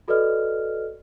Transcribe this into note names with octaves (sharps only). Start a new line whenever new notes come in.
F#4 A4 B4 D5 D#5 F6